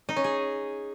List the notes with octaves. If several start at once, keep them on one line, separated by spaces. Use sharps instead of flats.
D#4
C#4
G#4